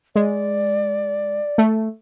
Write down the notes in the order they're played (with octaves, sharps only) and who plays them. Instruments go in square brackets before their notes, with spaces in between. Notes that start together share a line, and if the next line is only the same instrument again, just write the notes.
[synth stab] G#3 [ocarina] D5
[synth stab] A3